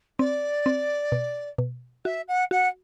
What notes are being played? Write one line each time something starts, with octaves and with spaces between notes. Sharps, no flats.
C4 D5
C4
B2
B2
F#4 E5
F#5
F#4 F#5